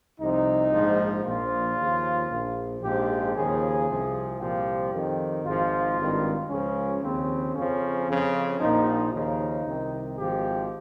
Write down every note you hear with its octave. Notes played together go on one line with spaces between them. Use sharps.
C2 C3 F3 D#4
A#1 G#2 F3
A#1 A#2 F3 F4
D#2 C#3 F3
A#1 A#2 F3
A#1 G#2 F3 G4
D#2 C#3 F3 G#4
C2 C3 F3
C2 A#2 F3 G4
F2 D#3
G#1 G#2 F3 F4
G#1 G2 D#3
C#2 C#3 F3 C#4
D#2 C#3 F3 C4
F2 C#3 F3 C#4
F2 C#3 F3
A#1 A#2 F3 D#4
D#2 C#3 F3 D#4
C2 C3 D#3
G#1 G#2 F3 G4